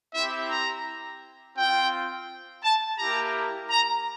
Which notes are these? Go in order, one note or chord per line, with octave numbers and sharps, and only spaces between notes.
C4 E4 G4 E5
A#5
C4 F4 G5
A5
A#3 E4 G4 A#5
A#5